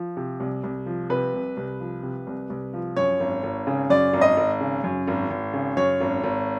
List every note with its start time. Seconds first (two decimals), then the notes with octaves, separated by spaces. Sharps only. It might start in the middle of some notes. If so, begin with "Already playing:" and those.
Already playing: F3
0.17 C3
0.40 C2
0.63 C2
0.86 F3
1.10 C3 B4
1.33 C2
1.57 C2
1.80 F3
2.03 C3
2.27 C2
2.50 C2
2.73 F3
2.96 F#2 C#5
3.20 G#1
3.43 G#1
3.67 C#3
3.90 F#2 D5
4.13 G#1
4.21 D#5
4.37 G#1
4.61 C#3
4.84 F#2
5.08 G#1
5.30 G#1
5.54 C#3
5.77 F#2 C#5
6.01 G#1
6.24 G#1